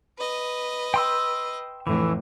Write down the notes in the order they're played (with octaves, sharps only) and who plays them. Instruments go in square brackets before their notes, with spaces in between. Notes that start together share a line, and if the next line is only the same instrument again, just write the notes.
[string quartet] B4 D#5
[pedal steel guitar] G5 C6 E6
[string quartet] F2 A2 D3 [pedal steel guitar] E3